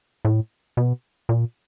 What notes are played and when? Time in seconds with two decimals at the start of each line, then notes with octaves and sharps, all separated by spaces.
0.25 A2
0.77 B2
1.29 A#2